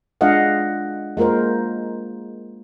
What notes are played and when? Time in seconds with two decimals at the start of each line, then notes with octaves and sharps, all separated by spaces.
0.21 G#3 D4 F4 D#5 F5 F#5
1.17 G#3 A#3 F4 A#4 C5